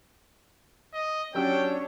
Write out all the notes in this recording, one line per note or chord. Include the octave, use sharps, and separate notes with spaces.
D#5
F#3 C#4 D4 G4 C#5 G5 E6